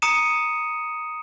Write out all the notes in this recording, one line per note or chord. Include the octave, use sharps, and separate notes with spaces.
A#5 D#6 C#7 D#7 E7